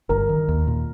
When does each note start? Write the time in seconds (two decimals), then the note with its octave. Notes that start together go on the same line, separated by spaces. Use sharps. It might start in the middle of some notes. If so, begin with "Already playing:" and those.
0.09 G1 A#4
0.29 D#3
0.48 D#2
0.67 A#2